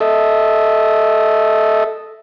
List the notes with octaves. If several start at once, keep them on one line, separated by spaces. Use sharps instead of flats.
A4 D#5 E5